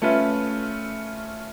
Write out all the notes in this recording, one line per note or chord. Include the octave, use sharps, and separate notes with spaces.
A3 C#4 F4 B4 E5